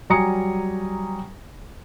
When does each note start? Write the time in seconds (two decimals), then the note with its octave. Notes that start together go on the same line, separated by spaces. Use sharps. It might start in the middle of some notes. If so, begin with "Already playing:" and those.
0.10 F#3 G3 G#5 A#5 D#6 C#7